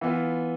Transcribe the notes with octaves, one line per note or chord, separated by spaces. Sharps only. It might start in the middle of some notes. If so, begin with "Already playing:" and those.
E3 B3 F4